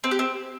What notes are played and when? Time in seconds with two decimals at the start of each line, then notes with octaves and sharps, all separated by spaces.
0.04 C4
0.11 G4
0.19 C4